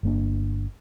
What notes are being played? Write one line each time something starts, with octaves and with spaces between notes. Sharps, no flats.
G1 A#3 D4